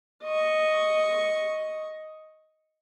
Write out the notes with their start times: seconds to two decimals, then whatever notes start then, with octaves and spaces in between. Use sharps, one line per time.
0.23 D#5 C#6